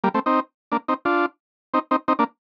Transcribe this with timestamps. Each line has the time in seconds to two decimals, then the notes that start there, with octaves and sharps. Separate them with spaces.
0.04 G3 A#3
0.14 A3 C4
0.26 C4 D#4
0.72 A#3 D4
0.88 C4 D#4
1.05 D4 F4
1.74 C4 D#4
1.91 C4 D#4
2.08 C4 D#4
2.19 A#3 D4